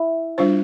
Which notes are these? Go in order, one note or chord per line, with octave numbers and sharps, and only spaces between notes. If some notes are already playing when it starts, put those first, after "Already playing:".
Already playing: E4
G3 D4 F4 C5